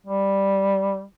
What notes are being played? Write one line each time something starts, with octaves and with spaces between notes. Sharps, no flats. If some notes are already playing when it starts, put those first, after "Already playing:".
G3